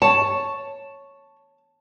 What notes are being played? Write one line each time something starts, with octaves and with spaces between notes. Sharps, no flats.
C#5 A5